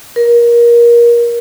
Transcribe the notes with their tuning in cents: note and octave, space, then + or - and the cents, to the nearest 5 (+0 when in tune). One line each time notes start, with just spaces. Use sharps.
A#4 +25